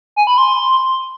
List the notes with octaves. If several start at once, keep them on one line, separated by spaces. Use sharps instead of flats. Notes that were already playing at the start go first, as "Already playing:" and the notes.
G#5
B5
C6